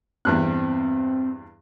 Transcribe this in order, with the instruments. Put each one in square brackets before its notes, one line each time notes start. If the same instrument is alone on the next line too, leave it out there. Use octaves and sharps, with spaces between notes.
[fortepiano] E2 G2 F#6 [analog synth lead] C4